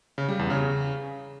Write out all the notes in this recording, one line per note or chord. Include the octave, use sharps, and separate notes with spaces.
C#3
G3
E2
C#3